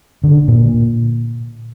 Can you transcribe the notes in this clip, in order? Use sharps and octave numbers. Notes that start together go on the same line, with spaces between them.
D3
A#2